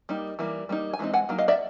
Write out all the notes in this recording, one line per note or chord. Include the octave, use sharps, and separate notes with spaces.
G3 A#3 D#4
E3 G3 A#3
G3 A#3 D#4
G#5
E3 G#3 C4 D#4
F#5 G#5
F#3 A#3 D#4
D#5 F5
D5 E5